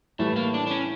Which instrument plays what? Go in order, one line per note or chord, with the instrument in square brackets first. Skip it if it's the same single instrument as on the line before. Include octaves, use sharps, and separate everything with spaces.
[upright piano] A2 E3 G3 [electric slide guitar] A3
[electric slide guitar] A#3
D4
D4
C#4